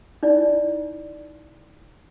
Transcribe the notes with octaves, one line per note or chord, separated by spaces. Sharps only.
D#4 E4 D5